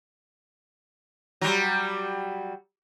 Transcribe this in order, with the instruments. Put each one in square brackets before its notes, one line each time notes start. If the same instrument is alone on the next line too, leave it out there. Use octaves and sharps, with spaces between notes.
[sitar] F#3 G3